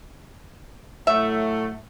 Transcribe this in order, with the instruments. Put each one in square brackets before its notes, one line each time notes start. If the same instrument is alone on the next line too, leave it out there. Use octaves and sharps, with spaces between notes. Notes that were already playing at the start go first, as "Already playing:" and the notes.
[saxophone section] A2 F#3 A3 [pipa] E5